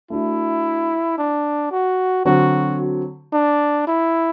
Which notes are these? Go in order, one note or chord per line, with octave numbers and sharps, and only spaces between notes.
A3 D4 E4 F#4
D4
F#4
D3 F#3 C4 F#4
D4
E4